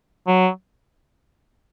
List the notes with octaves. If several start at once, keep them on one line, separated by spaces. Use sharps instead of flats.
F#3